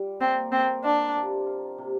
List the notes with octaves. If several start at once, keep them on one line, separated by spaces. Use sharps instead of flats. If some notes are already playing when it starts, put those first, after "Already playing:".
Already playing: G3 F4
A#3 C4
A#3 C4
D4 F4
C3
F4
C3